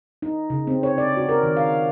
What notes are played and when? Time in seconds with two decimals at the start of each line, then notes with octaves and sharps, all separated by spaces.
0.22 D#4
0.50 C#3
0.67 C4
0.83 C#5
0.98 D5
1.17 F#4
1.29 A#4
1.43 D#3
1.57 F5